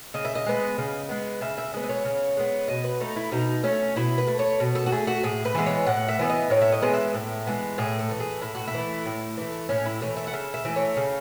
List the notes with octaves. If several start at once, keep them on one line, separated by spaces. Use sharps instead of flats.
C#3 D#5
E5
D#5
G#3 B3
C#3
G#3 B3
C#3 E5
E5
G#3 B3 D#5
D#5
C#5
C#3
G#3 B3
B2 D#5
B4
A3 D#4
E4
B2 D#4
A3 C#4
B2 E4
B4
A3
C#5
B2
A4
F#4
A3 G#4
F#4
A2 G#4
B4
E3 G#3 B3
C#5
A2 F#5
E5
E3 G#3 B3
D#5
A2 C#5
E5
D#5
E3 G#3 B3
E5
A2
E3 G#3 B3
A2 G#4
A4
E3 A3
G#4
A2 E4
F#4
E4
E3 A3
A2
E3 A3
A2 C#4
E4
E3 A3 C#5
E5
F#5
C#3 E5
E5
E3 A3
C#5
C#3